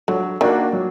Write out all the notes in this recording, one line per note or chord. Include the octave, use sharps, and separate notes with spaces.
D3 F#3
D#3 A#3 D4 F#4
F#3